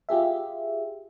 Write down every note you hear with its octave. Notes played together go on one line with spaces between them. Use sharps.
F4 G4 G#4 E5